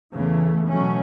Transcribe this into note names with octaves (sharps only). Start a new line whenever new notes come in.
E2 C#3 E3 A3
B2 F#3 A3 C#4